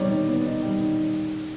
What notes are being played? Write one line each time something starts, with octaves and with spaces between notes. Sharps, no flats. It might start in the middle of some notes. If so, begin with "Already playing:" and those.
Already playing: D#3 G3 B3 D#4 C#5 D5
D#3
B3
D#4
G3
D#3